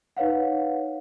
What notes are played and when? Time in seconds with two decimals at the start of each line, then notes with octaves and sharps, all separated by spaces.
0.17 D#4 B4 C#5 F5 F#5